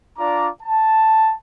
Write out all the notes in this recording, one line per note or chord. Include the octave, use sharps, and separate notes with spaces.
D4 F4 D5 A#5 D6
A5